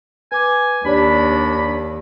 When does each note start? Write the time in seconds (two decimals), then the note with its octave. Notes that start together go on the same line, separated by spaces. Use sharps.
0.32 B4 G#5 D6
0.86 D#2 D4 G4 C#5 D5 B5